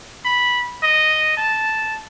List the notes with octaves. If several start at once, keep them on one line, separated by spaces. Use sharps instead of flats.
B5
D#5
A5